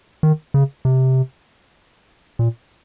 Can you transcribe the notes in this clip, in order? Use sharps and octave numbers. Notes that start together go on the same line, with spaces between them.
D#3
C#3
C3
A#2